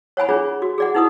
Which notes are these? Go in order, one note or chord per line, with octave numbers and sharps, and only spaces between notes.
C#5 F#5 G#5 B5
D4 F4 G#4 C#5
F#4
G#4 D5 F#5
D#4 E4 B4 F#5 D#6